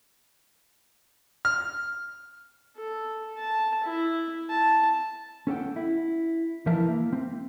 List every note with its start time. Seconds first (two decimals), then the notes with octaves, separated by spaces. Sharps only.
1.45 F6
2.77 A4
3.37 A5
3.84 E4
4.49 A5
5.47 C#4 A4 F#5 G5
5.76 E4
6.66 E3 F3 E4 A#4 E5 A5
6.89 A#3
7.13 C4